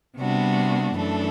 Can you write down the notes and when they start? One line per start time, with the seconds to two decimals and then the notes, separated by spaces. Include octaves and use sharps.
0.17 C3 G3 B3 D4 F#4
0.94 F#2 E3 A3 D4 A4